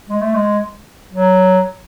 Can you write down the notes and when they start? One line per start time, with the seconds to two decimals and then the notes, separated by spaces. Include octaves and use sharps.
0.09 G#3
0.21 A3
0.35 G#3
1.12 F#3